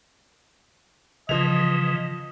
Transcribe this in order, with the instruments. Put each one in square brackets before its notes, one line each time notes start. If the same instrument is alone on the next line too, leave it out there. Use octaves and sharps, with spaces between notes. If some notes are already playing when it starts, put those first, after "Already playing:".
[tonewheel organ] C#3 E3 [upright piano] F3 F7 [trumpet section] D#5